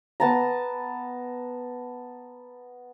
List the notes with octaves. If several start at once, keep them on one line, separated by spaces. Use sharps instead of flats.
B3 A5 A#5